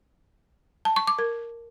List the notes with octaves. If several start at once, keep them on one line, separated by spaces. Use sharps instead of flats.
A5
C#6
D6
A#4